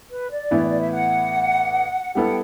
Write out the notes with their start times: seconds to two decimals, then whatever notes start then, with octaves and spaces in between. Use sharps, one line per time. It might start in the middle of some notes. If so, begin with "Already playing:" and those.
0.10 B4
0.30 D5
0.51 A2 E3 B3 E4
0.69 D5
0.80 E5
0.92 F#5
2.15 G3 B3 E4 A4 F#5
2.27 G5